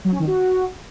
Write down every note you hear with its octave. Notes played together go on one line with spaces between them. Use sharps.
F#3
C#4
D#3
F#4